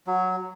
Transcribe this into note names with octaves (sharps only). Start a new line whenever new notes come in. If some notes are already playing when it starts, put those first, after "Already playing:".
F#3